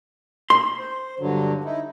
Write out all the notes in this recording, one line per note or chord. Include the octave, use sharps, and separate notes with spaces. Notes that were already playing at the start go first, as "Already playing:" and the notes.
C6
C5
G2 D3 F#3
D#4 E4